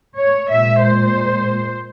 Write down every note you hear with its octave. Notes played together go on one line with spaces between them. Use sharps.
C#5
A#2 G#3 E5
C5